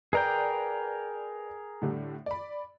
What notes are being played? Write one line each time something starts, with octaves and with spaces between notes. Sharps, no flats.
G#4 A#4 B4 D5 G5 A#5
A2 D3 G3
D5 B5